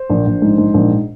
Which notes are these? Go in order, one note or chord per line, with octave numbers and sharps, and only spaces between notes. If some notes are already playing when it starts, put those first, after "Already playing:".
Already playing: C5
A#1
A#1
G#2
G#2
A#1